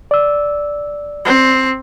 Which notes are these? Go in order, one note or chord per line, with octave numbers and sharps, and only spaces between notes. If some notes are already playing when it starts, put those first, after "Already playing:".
D5 E6
C4